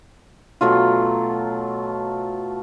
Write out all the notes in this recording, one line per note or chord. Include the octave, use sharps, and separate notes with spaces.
B2 F#3 A3 F4